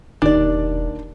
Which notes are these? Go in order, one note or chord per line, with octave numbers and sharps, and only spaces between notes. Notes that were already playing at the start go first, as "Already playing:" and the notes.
E1 D#2 D#3 D4 D5